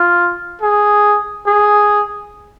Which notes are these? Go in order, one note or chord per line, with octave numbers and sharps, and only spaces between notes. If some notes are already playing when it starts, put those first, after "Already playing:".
Already playing: F4
G#4
G#4